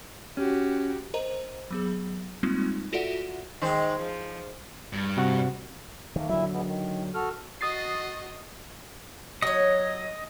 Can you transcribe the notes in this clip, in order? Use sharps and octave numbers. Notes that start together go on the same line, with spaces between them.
C#4 F#4 G4
A#4 C5 D#5 A#5
F#3 B3 G#4
G3 G#3 A#3 C4 D#4 F4
F4 F#4 A4 D5 E5 F#5
D#3 G#3 C5
F3
G2
C3 F#4 F#5
D#3 A3 A#3
A#2 D3 F#3 E4 E5
A#2 G#3 B3
D#3
F#4 A4 F6
F#4 D#5 D#6 A6 C7
F#3 C#5 D#5